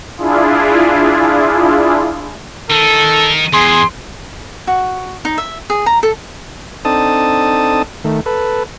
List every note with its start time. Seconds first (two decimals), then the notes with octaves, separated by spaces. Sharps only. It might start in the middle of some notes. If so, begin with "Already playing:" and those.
0.18 D4 E4 F4 G#4
2.70 D#3 D#4 A4
3.54 E2 G#4 C6
4.67 F#4
5.25 D#4
5.38 E5
5.70 G#4
5.86 A#5
6.03 A4
6.85 C4 D4 D#4 A4 A5 D#6
8.04 D#3 A3
8.26 A4 B4